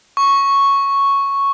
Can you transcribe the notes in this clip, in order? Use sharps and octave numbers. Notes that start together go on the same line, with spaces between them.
C#6